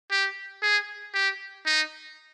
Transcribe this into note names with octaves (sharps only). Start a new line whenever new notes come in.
G4
G#4
G4
D#4